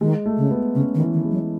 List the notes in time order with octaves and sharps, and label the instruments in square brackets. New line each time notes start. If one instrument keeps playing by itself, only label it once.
[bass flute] D#3 [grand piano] G#3
[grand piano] A3
[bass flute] C#3
[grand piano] B3
[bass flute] C#3 [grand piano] C#4
[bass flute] D#3
[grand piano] E3
[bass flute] D#3
[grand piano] G#3
[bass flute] F#3